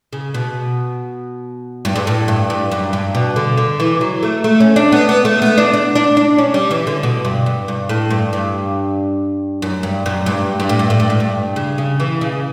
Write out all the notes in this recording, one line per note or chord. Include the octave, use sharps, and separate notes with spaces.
C#3
B2
G2
G2
A2
G2
G2
F#2
G2
B2
D3
D3
E3
F#3
A3
A3
C#4
D4
B3
B3
A3
B3
D4
D4
D4
D4
C#4
G3
E3
D3
B2
G2
G2
G2
A2
G2
G2
F#2
G2
F#2
G2
G2
A2
G2
A2
G2
A2
G2
C#3
C#3
E3
C#3